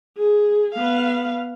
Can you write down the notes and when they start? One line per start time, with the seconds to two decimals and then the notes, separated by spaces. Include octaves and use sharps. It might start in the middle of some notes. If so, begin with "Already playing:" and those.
0.17 G#4
0.75 B3 F5